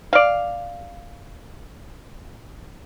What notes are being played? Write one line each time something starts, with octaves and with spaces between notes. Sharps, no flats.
D5 F5